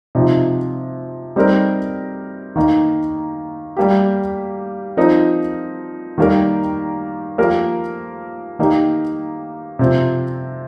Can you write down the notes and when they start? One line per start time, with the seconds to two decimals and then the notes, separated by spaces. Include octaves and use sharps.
0.15 C3 F3 D#4
1.36 G3 C4 D#4 G4 A#4
2.56 D#3 A#3 D#4
3.77 G3 A#3 G4
4.97 F3 C4 D#4 A#4
6.18 D#3 G3 A#3 G4 A#4
7.38 F3 A#3 G4 A#4
8.59 D#3 A#3 D#4 G4
9.79 C3 F3 C4